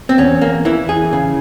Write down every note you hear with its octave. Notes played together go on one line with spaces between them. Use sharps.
C4
E2 C#4
A#3
E3 E4
G#4
C#3